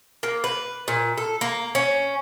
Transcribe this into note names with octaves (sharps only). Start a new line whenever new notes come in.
A#3
B4
A#2
A4
A#3
C#4